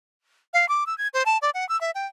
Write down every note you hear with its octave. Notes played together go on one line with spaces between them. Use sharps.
F5
D6
E6
G#6
C5
A5
D5
F#5
E6
E5
G5